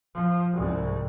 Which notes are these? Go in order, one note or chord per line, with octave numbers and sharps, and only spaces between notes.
F3
C2 G#2